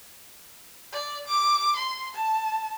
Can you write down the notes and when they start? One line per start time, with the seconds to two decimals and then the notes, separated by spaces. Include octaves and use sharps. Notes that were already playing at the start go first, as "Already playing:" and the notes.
0.92 D5
1.27 D6
1.76 C6
2.15 A5